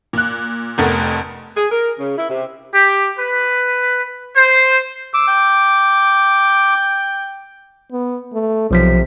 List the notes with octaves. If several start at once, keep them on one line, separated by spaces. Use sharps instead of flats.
A#2 F#6
F1 F2 A3 B3 A#4
G#4
A#4
C#3
E4
C3
G4
B4
C5
D6 E6
G5
B3
A3
B1 C3 F3 B6